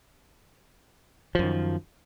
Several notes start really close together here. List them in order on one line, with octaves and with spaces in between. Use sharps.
F3 F#2 D#3